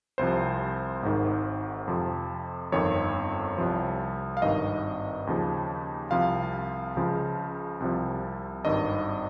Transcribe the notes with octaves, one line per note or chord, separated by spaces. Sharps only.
C2 C3 F3 C5
G#1 G#2 D#3
F2 C3 F3
G1 F2 D#3 C#5
C2 C3 F3
F5
G#1 G2 D#3 D#5
D#2 C#3 F3
C2 C3 F3 F5
C#2 C#3 F3
C2 C3 F3
G#1 G2 D#3 D#5